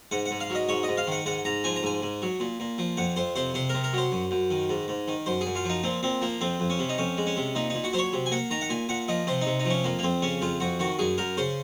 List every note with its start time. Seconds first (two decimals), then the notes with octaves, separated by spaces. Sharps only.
0.11 G#2 F#5
0.26 F#5
0.31 G#2
0.40 F5
0.50 F#3 D#5
0.69 G#2 C#5
0.83 D#5
0.88 G#2
0.97 F5
1.07 D#3 F#5
1.26 G#2 F#5
1.45 G#2 A#5
1.64 F3 G#5
1.76 A#5
1.83 G#2 G#5
2.02 G#2
2.22 F#3
2.40 A#2
2.60 A#2
2.78 F3
2.97 F2 F#5
3.16 F2 C5
3.36 C3 C5
3.54 C3 C5
3.69 C3 A#4
3.84 A#4
3.93 F#3 C5
4.12 F#2
4.31 F#2
4.50 D#3
4.69 G#2
4.88 G#2
5.08 D#3
5.26 F#2 C5
5.41 G#4
5.46 F#2
5.55 F4
5.64 F3 D#4
5.84 A#2 C4
6.03 A#2 C4
6.21 F3 A#3
6.41 F2 C4
6.60 F2
6.70 C#4
6.79 C3
6.89 D#4
6.98 F2 C#4
7.17 G#3
7.27 C#4
7.37 C3
7.55 A#2 D#4
7.70 A#2 D#4
7.84 F#4
7.93 F#3 C5
7.99 C#5
8.13 C3
8.26 G#5
8.31 A#3 F#5
8.51 D#3 A#5
8.61 F#5
8.70 A#2 G#5
8.89 A#2 F#5
9.08 F3 D#5
9.27 C3 C5
9.41 C3 D#4
9.60 D#4
9.65 F3 C#4
9.84 F2 A#3
9.99 A#3
10.03 F2 C4
10.22 C#3 C#4
10.41 F2 F4
10.60 F2 F#4
10.79 D#3 F#4
10.99 F#2 G#4
11.18 F#2 A#4
11.37 C#3 C5